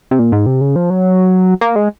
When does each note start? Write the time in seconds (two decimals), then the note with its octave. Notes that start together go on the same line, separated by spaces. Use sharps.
0.11 C3
0.19 A#2
0.32 G#2
0.46 C3
0.61 C#3
0.76 F3
0.90 F#3
1.61 A#3
1.76 G#3